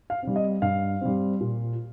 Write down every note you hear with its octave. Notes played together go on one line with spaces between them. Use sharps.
F5
G3 C4
D#5
G2 F5
G3 C4
A#2